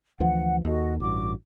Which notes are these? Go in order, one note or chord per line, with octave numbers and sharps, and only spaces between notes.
D2 E3 F3 F#5
D#2 F#4 A4 D#5
A1 G2 F#4 D6